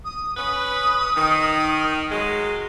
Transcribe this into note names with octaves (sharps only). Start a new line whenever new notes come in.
D#6
C#4 B4 D#6
D#3
F#3 G#3